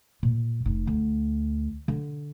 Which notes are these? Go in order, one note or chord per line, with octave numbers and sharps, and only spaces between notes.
A#2
F1 D#4
D2
D3